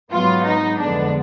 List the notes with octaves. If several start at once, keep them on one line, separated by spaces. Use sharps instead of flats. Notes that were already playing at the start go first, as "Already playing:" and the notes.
G#2 F#3 B3 F4
D#4
F2 D3 G#3 B3 D4